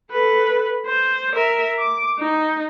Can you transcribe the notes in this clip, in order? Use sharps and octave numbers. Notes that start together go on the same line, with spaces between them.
A4 B4
C5
A#4 E5
D6
D#4